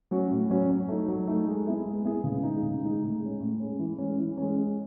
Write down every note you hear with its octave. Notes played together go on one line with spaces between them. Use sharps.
F#3 C#4 F#4
A2
F#3 C#4 F#4
F#3
A3 D#4
F#3
A3 D#4
G#3
B3 E4 G#4
G#3
B3 E4 G#4
C#3
G#3 D#4
C#3
G#3 D#4
A2
G#3 C#4
A2
G#3 C#4
E3
G#3 C#4
E3
G#3 C#4
G#3